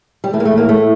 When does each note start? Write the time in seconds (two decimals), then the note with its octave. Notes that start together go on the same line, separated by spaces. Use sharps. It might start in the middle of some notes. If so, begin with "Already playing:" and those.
0.24 G3
0.33 E3 A3
0.40 A#3
0.45 A3
0.52 A2
0.57 A#3
0.69 A2 A3